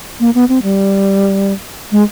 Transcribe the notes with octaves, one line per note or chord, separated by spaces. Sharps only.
A#3
B3
C4
G3
G#3